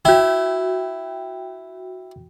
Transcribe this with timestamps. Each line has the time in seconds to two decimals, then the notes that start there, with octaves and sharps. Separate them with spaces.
0.05 E4 F#4 G5